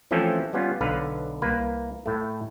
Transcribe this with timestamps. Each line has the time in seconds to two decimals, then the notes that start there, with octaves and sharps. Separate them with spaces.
0.11 E3 F3 A3 C4 C#4 A4
0.53 G3 B3 C#4 F4
0.81 B1 D3 B4 F5
1.42 C2 A#3 B4
2.06 A2 A3